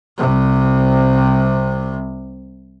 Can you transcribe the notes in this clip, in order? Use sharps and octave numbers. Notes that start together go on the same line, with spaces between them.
C2 C3